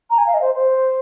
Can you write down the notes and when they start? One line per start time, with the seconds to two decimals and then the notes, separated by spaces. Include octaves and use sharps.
0.10 A#5
0.18 G#5
0.27 F5
0.34 D#5
0.41 C5
0.55 C5